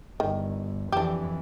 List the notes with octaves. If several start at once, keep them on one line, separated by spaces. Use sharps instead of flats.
G1 D#3
F2 E3 D4 G4